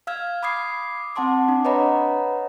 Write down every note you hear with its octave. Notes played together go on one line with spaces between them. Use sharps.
F5 E6 F6 G#6
B5 D6 D#6 G#6 C7
C4 F#5 A5 C6 D6
D4
B4 C#5 D#5 F#5 A#5 B5